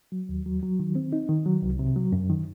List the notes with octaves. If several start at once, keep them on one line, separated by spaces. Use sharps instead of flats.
F#3
D#2
F#3
F#3
D#3
C4
D#4
D#3
F#3
C2
C3
F#3
F#2
D#3